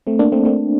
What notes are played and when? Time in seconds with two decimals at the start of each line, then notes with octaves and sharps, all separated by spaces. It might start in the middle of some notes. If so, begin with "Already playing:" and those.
0.07 A3 C4
0.19 A#3 D4
0.32 A3 C4
0.45 A3 C4